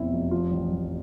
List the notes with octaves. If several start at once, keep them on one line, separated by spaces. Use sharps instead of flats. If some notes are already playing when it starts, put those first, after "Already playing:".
Already playing: F1 E2 B2 C4 E4
F1
F3 F4
A1
A1